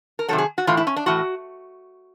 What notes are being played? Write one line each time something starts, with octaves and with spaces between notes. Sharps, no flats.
A#4
C3 D#3 F#3 A4
G#4
F#4
A2 E3 F4
E4
C#4
D4
A2 E3 F#4